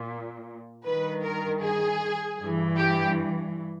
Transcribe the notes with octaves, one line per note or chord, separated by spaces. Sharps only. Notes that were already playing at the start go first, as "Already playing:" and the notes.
Already playing: A#2
G2 D#3 B4
A#4
G#4
G2 E3
G4